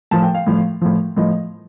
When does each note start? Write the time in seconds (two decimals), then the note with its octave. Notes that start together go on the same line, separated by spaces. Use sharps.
0.11 A2 F3 A5
0.23 G5
0.34 F5
0.46 A2 F3
0.81 A2 F3
1.16 A2 F3 D#5